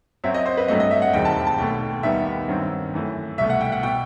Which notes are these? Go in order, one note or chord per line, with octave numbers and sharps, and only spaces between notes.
F#2 F#3 C4 E5
D#5
C5
B4
G2 F#3 A3 C4 D#5
D#5
E5
F#5
E1 D#2 D#3 G3 C4 G5
A5
A5
B1 B2 A3 G5
D#2 D#3 G3 B3 E5
G2 D#3 F#3 C4
F#2 E3 A3
C2 B2 A3 E5
F#5
G5
F#5
B2 G5